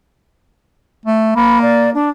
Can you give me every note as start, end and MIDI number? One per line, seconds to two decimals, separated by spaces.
1.06 1.35 57
1.36 1.94 58
1.36 1.62 83
1.62 1.90 74
1.94 2.10 62